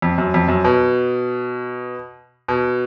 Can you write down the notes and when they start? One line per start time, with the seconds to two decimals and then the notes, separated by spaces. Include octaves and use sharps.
0.02 F2
0.18 F#2
0.34 F2
0.48 F#2
0.65 B2
2.48 B2